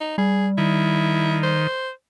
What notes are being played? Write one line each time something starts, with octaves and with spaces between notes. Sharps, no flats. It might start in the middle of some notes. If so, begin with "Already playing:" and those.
D#4
G3 G#4
D#3 E4
C5